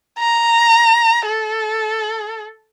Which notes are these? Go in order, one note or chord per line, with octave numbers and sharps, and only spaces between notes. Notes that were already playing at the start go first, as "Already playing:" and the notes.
A#5
A4